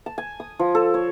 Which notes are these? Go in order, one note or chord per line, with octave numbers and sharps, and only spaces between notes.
A5
G#5
D#6
F3
A4
C#5